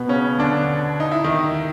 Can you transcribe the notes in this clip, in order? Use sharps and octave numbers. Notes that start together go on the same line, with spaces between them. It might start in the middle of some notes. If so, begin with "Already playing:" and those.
Already playing: B2 B3
C#3 C#4
D3 D4
D#4
E4
D#3 D#4